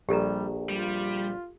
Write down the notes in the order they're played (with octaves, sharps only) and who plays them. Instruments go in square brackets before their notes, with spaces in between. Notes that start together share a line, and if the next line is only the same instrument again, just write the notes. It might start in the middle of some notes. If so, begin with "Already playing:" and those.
[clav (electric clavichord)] A#1 [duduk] G3 [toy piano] G4 A4 A#5
[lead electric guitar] G3 [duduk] F4